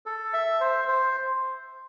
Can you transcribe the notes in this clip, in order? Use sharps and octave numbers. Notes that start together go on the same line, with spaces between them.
A4
E5
C5
C5